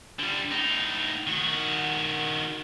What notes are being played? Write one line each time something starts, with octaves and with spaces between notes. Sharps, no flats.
D3 G3
A2 D#4
D#3 F#4